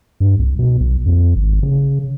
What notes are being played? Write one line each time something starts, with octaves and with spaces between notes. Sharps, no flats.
G2
C2
B2
B1
F2
G#1
C#3